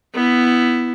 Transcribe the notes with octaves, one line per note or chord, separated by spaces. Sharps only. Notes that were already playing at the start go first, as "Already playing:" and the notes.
B3 E4